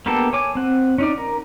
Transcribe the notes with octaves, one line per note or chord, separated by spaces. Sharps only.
A#3 B3 D4 G4 A4
C#5 G#5 D6
C4 F#5
C#4 D#4 D5
A#4